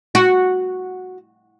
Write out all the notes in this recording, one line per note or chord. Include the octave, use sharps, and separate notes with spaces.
F#4